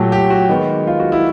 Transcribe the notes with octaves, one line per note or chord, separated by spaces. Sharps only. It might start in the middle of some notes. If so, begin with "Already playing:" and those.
Already playing: A#2 F#3 A3 G4
G4
F#4
D#3 G#3 B3
F4
F#4
E4